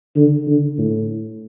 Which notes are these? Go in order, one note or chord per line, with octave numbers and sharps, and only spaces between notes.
D3
D3
A2